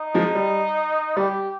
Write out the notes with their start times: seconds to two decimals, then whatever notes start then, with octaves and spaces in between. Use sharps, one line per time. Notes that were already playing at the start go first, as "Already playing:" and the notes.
Already playing: D#4
0.14 F3 G#3
0.35 G3
1.17 G3 G4